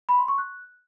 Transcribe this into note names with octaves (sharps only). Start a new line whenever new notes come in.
B5
C6
C#6
F#6